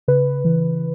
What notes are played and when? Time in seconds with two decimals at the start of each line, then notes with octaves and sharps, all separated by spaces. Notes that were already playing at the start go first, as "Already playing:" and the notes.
0.08 C#3 B4
0.44 E3